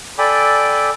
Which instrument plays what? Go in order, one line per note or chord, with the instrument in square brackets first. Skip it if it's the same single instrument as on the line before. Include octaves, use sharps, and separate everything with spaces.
[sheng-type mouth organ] A4 D5 G5 G#5 B5 D6